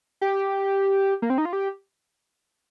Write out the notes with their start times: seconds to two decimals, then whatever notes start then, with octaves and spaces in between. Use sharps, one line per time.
0.21 G4
1.22 A#3
1.30 C4
1.38 D#4
1.45 F4
1.53 G4